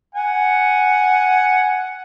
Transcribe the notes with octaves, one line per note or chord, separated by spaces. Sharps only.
F#5 G#5